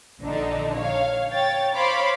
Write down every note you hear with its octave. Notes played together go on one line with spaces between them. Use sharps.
A#1 D3 F3 D4 D#4
C#5 F5
C#5 G5 A6
C5 C#5 F5 B5 C6 D6